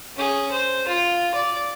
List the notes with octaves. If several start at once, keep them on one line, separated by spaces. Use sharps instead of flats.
C#4 G#4
C5
F4
D5